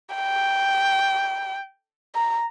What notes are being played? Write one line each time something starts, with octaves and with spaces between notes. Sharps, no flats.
G5
A#5